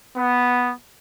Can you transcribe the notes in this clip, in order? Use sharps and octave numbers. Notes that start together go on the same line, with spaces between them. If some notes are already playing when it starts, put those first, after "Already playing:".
B3